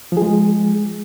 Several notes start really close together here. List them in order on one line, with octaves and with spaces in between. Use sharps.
F3 G#4 G#3